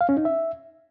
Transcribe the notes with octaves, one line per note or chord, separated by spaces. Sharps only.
F5
C#4
D#4
E5